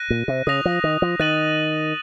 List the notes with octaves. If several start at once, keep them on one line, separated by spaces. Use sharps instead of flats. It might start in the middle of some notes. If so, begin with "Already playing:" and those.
Already playing: F#6 A#6 D#7
A#2
C3
C#3 D#6 A#6 F7
F3
D#3
F3
D#3 F#6 A6 D#7 F#7